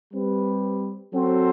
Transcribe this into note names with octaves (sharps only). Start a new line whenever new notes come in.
G3 C4 G4 B4
F#3 C4 F#4 A4 C5